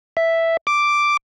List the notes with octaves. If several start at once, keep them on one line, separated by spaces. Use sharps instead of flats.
E5
D6